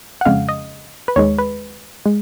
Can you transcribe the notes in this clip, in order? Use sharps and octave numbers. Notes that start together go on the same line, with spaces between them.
F#5
F2 C#3 G#3 F5
D#5
B4
D#2 D#3 G#3 C#5
B4
G#3